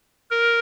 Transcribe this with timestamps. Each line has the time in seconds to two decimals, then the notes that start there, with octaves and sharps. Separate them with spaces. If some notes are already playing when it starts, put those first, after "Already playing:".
0.31 A#4